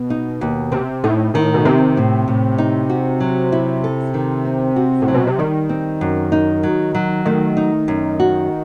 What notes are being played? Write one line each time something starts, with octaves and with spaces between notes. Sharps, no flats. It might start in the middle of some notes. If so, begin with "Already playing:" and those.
Already playing: B2
D#4
D#2
C3 C4
A2 D#4
A2 D#3
B2
C3 C4
A2
A2
D#4
F#4
F#3
E4
A4
D#3
C4
F#4
A2
F#3
B2
C3
D#3 G3
C4
F#2
D#4
F#3
F#3
D#3 A3
D#4
F#2
F#4